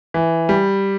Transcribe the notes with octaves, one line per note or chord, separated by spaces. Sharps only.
E3
G3